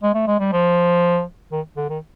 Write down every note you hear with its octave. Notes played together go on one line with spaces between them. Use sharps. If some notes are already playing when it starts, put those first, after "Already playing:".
G#3
A3
G#3
G3
F3
D#3
D3
D#3